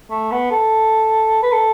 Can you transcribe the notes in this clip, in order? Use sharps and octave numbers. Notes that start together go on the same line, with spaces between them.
A3
B3
A4
B4
A4